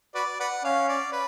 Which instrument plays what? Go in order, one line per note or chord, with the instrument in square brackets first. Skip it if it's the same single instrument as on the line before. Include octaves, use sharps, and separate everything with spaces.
[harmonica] F#4 B4 D5
B4 D5 F#5
[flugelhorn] C#4 [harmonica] F5
[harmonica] D5
B4